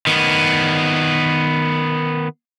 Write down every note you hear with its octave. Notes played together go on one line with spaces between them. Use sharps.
D#3 B3